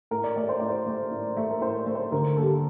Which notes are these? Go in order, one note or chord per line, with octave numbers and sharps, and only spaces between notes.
A2 A#4
D5
A3 D5
C5
A2 D5
C5
A3
A2
A3
A#4
A2 C5
A3
C5
D3 A#4
G3 A#3 A4